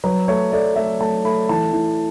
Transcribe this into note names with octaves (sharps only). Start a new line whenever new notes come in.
F#3 B4
A3 C#5
A3 D5
A3 E5
A3 A5
A3 B5
E3 A5
E3